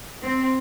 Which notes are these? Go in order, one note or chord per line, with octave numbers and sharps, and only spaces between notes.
C4